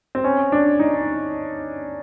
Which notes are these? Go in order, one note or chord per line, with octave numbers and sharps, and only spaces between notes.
C4
C#4
D4
D#4